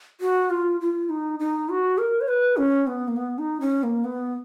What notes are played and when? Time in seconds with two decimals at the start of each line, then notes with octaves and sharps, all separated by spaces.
0.21 F#4
0.50 F4
0.81 F4
1.10 D#4
1.40 D#4
1.69 F#4
1.98 A#4
2.21 C#5
2.28 B4
2.57 C#4
2.87 B3
3.08 A#3
3.16 B3
3.38 D#4
3.61 C#4
3.83 A#3
4.04 B3